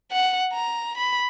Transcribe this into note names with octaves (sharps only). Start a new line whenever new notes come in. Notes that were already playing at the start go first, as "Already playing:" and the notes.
F#5
A#5
B5